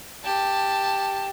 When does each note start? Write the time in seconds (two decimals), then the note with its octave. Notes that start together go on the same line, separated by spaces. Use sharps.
0.24 G4 A5